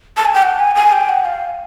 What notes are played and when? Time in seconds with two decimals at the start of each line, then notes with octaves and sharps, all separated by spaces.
0.17 A5
0.25 G#5
0.34 G5
0.43 F#5
0.59 G#5
0.75 G#5
0.92 G5
1.09 F#5
1.25 F5